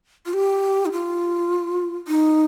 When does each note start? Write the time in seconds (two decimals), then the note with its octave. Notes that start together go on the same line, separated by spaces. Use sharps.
0.26 F4
0.34 G4
0.86 D#4
0.92 F4
2.08 D#4